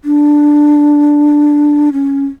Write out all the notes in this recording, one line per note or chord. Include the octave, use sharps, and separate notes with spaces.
D4
C#4